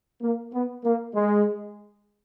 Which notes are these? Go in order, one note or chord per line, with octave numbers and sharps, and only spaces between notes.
A#3
B3
A#3
G#3